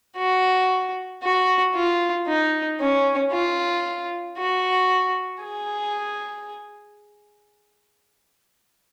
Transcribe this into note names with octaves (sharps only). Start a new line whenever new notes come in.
F#4
F#4
F4
D#4
C#4
F4
F#4
G#4